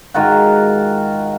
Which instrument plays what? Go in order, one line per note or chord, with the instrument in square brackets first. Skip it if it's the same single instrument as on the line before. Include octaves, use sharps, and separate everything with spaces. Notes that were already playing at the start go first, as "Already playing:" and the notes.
[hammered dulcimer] G#2 D#3 F4 F#4